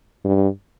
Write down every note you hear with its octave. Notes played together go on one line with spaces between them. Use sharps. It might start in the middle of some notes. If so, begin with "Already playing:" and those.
G2